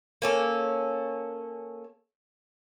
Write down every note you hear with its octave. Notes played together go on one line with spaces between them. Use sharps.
A#3 C#4 A4